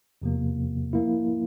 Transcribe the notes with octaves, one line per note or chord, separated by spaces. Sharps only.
E2 C3 F3 A#3
F3 A#3 E4